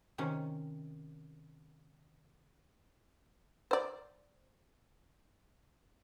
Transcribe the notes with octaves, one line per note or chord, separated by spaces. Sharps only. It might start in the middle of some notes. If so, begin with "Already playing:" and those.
C3 D#3 C#4
C5 D5